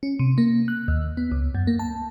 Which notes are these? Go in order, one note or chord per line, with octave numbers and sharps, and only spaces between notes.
C#4
C3
A#3
F#6
D#2
B3
C#2
F#2
A#3
A5